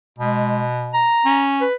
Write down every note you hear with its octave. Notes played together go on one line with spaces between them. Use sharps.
B2 G#3
A#5
C#4
B4